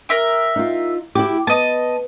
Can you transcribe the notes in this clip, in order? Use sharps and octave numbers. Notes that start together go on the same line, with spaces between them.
A#4 E5 G5
D#4 F4
E4 F#4 G4 D6
B3 D#5 A5